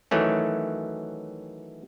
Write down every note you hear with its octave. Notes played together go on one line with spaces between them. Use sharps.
D#3 E3 F#3 A3 C#4